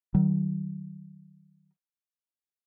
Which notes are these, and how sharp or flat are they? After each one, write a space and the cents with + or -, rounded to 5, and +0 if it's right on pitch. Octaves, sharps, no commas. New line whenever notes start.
D#3 -5 F#3 +40